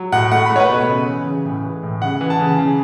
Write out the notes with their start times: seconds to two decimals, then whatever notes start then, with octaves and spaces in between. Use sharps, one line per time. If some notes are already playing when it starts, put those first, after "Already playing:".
Already playing: F#3
0.12 A2 F#5
0.31 A3 F#5
0.45 A3 B5
0.56 C#5
0.60 B4
0.69 B2
0.88 C#3
1.07 E3
1.26 C#3
1.45 A2
1.64 E3
1.83 A2
2.02 C#3 F#5
2.21 E3
2.30 A5
2.40 C#3
2.59 C#3